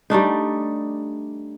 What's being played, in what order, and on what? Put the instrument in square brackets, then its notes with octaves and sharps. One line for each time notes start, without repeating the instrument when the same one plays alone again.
[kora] G3 A3 D4 D#4